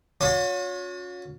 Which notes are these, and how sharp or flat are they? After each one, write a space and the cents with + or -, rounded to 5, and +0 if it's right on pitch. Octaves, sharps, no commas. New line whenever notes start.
C#4 +20 F#4 -45